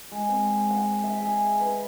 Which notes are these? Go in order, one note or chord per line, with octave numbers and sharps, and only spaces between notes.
G#3
C4
F#5
E5
G#4
B4